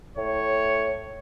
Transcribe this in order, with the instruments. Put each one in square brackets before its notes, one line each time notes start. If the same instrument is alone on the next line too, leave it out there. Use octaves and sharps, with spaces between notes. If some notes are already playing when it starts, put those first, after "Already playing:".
[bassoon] A2 [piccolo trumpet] C#5